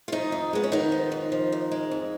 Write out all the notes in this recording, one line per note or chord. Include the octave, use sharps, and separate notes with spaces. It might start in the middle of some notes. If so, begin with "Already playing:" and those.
F4
D#3 F3 D#4
F2
G#3 B3
C#4
D#3 B3 D#4
F3
F2
F3
F2
G#3
F2